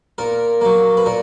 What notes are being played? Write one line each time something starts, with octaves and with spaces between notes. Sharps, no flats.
A#2 A#4
F#3 A#3
B4
A#2 A#4